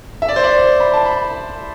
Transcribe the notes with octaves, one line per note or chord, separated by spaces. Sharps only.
E5
D5
C5
D5
B5
A5
B5